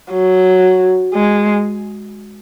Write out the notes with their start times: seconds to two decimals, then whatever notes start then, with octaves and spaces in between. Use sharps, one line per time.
0.12 F#3
1.14 G#3